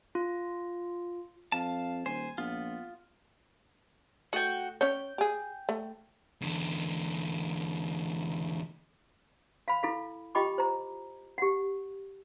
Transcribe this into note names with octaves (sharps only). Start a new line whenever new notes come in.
F4
F2 F5 A5
D#1 C5 G#5
A#1 B3 F4
A3 F#4 G5
C#4 C#5 G5
G4 G#4
A3
E2 D3
F5 B5
E4 A4 F5
F4 G4 D#5 G5 B5 D6
C5 A#5
G4 F#5